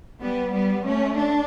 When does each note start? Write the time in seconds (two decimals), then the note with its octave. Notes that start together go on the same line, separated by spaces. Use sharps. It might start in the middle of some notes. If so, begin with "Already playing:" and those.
0.20 G3 B3
0.53 G3 B3
0.85 A3 C#4
1.17 D4